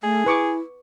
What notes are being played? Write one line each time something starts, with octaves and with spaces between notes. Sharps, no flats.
A3 G#4
E4 B4 C#6 D6